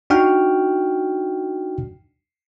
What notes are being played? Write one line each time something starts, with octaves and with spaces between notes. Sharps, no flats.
D4 D#4 F#4 G5 F6